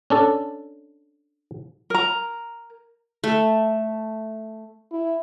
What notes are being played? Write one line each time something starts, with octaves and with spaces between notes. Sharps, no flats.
C#4 D4 A4
A#4 A#5
A3
E4